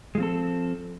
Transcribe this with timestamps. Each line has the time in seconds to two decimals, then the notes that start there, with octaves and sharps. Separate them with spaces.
0.15 G#3
0.17 F3
0.20 C4
0.23 A4